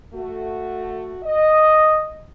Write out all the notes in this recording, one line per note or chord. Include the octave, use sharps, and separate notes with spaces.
A3 F#4
D#5